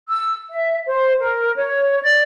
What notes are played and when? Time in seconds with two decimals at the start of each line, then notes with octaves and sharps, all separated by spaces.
0.08 E6
0.50 E5
0.87 C5
1.21 A#4
1.56 C#5
2.02 D5